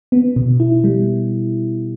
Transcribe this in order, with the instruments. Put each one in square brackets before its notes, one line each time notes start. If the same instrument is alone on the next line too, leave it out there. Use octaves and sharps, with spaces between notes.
[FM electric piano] B3
B2
E4
G3